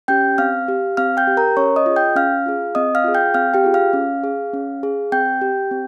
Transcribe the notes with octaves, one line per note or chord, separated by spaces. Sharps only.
C#4 G4 G5 G6
C4 F5 F6
G4
C4 F5 F6
G5 G6
G4
A#4 A#5
C#4 C#5 C#6
D#5 D#6
F4 G#4
G5 G6
C#4 F5 F6
F4 G#4
C4 D#5 D#6
F5 F6
F4 G#4
G5 G6
C4 F5 F6
G4 G5
F4 G#4
F5 F6
C#4
G#4
C#4
G#4
C4 G5 G6
G4
C4